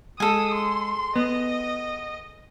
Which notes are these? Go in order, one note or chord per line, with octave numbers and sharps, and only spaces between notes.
G#3 G#4 A4 D#6
C6
B3 D#5